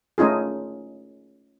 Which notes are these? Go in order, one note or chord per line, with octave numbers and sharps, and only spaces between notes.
A3 C#4 D#4 F4 G#4